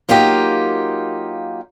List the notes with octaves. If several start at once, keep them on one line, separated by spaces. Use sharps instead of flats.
F#3 A#3 D#4 F4 G4